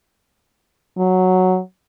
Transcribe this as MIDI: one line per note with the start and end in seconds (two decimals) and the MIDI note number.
0.97 1.59 54